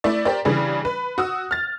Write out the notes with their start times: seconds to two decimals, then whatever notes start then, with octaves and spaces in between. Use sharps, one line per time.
0.04 A3 E4 D5
0.25 G4 A#4 C5 D5
0.45 C#3 E3 G3 D4 G#4
0.85 B4
1.18 F#4 D#6 E6
1.51 F6 A6